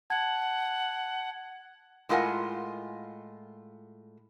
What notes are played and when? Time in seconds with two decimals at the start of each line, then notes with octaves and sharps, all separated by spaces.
0.10 F#5 A5 G#6
2.09 A2 G#3 F4 A#4 F#5 G#5